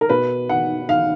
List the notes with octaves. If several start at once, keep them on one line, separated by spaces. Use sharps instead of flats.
A#4
B2 B4
F#5
F5